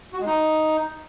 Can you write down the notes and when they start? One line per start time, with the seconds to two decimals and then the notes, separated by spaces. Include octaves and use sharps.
0.13 F#4
0.19 G#3
0.26 D#4